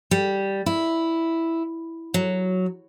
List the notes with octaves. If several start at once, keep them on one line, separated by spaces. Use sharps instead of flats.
G3
E4
F#3